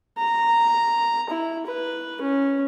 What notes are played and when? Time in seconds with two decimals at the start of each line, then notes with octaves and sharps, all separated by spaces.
0.18 A#5
1.30 E4
1.67 B4
2.22 C#4